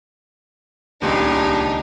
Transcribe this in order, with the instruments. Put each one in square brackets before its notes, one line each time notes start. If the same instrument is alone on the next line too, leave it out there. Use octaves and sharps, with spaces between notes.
[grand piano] D#1 C#2 [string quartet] D4 D#4